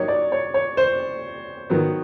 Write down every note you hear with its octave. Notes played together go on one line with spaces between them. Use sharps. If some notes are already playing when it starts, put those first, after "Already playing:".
Already playing: F#3 A#3 D#4 G4 C#5
D5
C#5
C#5
C5
D#3 F#3 B3